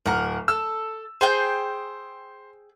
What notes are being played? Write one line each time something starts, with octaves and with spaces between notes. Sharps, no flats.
D1 A#4 F#5 A#5
A4 E6
G#4 C5 G5 G6